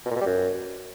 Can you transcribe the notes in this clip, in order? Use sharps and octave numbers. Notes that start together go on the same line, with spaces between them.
B2
A#2
B2
G3
F#2